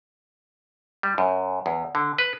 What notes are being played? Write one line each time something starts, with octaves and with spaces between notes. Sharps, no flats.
G3
F#2
E2
D3
B4